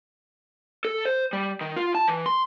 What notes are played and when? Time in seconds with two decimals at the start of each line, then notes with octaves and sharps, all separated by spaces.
0.85 A4
1.05 C5
1.33 G3
1.61 D#3
1.76 F4
1.95 A5
2.08 E3
2.26 C6